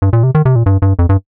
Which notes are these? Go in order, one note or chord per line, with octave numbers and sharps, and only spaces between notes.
G2
A#2
C3
D#3
C3
A#2
G2
G2
F2
G2